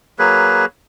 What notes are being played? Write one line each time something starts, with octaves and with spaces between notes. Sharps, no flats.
F#3 A#3 G#4 B4